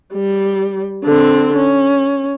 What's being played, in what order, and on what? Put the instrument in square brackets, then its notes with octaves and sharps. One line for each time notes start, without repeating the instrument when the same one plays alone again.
[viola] G3
D3 C4
C#4